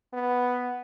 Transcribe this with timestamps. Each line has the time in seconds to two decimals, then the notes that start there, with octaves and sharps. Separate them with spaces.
0.13 B3